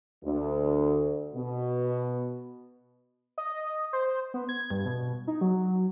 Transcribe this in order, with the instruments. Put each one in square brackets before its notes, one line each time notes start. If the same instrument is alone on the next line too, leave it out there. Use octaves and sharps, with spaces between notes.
[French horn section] D2
B2
[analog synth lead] D#5
C5
B3
G#6
G2
B2
D#4
F#3